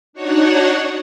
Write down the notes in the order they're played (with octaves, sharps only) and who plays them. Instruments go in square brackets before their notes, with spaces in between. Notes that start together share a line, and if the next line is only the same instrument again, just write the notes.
[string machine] D4 D#4 F#4 C#5 F#5